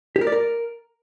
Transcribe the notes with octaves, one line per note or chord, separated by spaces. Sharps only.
G4
A#4
D5
A#4